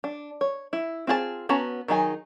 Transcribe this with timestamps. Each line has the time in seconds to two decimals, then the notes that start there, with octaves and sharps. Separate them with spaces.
0.04 D4
0.41 C#5
0.73 E4
1.07 C4 F4 G#4 C5 A5
1.49 B3 C#4 F#4 A5 A#5
1.88 D#3 F#3 D#4 G#4 G#5